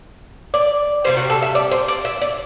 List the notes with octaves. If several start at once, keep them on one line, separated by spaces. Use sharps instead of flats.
D5
C3 E3 G3 C5
F#4
A4
E5
D5
C5
D5
E5
D5